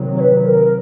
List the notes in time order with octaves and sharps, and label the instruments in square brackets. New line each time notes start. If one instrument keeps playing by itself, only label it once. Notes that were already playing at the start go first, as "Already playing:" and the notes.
Already playing: [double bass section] C3 D#3 F#3
[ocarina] C#5
B4
A#4